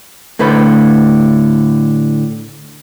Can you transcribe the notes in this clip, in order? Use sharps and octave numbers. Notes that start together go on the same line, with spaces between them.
A2 D3 B4 C5 B5